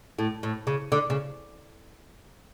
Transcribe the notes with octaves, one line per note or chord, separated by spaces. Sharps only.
A2
A2
C#3
D3
C#3